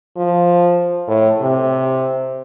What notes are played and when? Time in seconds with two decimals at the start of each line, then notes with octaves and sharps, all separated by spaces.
0.17 F3
1.08 A2
1.41 C3